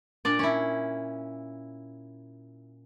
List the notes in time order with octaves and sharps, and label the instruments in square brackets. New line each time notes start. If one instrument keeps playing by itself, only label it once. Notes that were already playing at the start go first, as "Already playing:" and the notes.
[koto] A#2 D4 D5
C#4 E4